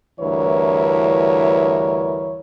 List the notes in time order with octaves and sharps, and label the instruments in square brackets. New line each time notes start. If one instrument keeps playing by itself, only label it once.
[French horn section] D2 G2 E3 E4 A#4 C#5